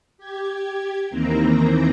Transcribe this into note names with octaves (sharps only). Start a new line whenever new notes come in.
G4 G#6
D#2 D#3 E3 A#3 C4 A#5